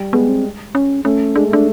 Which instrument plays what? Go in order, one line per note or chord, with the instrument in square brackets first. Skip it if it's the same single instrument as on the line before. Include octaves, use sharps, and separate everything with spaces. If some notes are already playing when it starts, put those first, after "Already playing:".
Already playing: [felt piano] G3
[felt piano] G#3 [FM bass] B3
[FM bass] C4
C#4
[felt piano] A3 [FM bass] C#4
[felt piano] G#3 [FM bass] D4
[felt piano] A3 [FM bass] D4